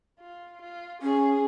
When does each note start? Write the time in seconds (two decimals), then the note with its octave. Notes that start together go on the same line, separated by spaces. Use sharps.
0.20 F4
0.62 F4
1.02 C#4 G#4